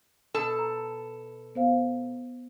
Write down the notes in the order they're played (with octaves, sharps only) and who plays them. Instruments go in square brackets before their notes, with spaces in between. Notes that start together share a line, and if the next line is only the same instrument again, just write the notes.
[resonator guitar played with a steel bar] B2 A4 A5
[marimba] A#5
B3 C5 F5